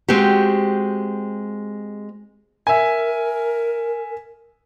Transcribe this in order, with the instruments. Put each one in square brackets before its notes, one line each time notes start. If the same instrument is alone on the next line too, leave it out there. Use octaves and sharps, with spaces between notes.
[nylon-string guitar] G#3 C4 F#4 G4
[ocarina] A#4 [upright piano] E5 G#5